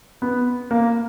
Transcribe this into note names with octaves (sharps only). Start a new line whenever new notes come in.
B3
A#3